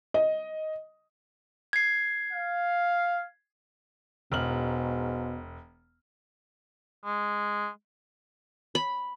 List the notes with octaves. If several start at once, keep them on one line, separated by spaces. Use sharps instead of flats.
D#5
G#6 C7
F5
E1 G#2 B2 F6 F#7
G#3
B5